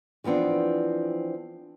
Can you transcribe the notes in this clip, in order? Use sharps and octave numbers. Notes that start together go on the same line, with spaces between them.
E3 F3 B3 C4 D4